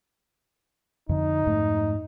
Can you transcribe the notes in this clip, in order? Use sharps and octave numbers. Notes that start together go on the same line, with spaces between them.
F2 D3 D#4
F2 G#2 A3